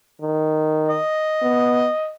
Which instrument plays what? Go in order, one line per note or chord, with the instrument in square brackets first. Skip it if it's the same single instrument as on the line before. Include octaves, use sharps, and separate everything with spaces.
[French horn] D#3
[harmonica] D#5
[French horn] B3